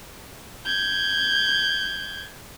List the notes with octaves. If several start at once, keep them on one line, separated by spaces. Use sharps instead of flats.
G6 G#6